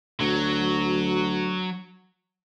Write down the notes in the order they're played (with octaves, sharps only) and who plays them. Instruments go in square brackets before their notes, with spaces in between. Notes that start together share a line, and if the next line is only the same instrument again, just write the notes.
[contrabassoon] D2 [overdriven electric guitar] F#3